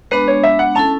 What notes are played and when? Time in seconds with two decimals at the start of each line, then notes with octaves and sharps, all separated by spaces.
0.11 G#3 B3 D4 B4
0.28 C#5
0.44 E5
0.59 F#5
0.75 C#4 E4 A4 A5